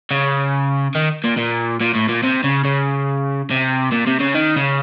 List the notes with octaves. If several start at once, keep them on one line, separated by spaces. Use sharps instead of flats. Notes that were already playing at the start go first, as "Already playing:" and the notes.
C#3
D#3
A#2
A#2
A#2
A2
A#2
C3
C#3
C#3
C3
A#2
C3
C#3
D#3
C#3